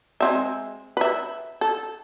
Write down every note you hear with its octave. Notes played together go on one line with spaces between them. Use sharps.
G#3 C4 E5
B4 E5
A4